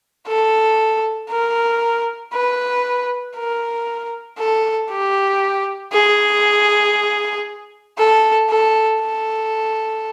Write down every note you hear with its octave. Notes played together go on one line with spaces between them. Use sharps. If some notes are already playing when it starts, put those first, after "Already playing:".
A4
A#4
B4
A#4
A4
G4
G#4
A4
A4
A4